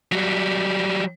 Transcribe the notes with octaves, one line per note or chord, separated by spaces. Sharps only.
F#3 G3